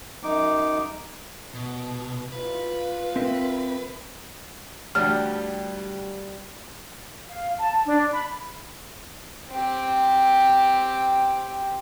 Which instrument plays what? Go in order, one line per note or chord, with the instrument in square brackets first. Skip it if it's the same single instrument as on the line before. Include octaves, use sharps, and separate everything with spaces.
[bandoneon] F#2 D#4 D6
[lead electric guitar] B2
[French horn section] D#2 E4 F4 [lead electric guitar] B4
[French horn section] F4
[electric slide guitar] C4 A#4 E5
[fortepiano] D2 F3 D4 [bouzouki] G3 [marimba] F6
[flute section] F5
A5
D4
B5
[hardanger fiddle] C4 G4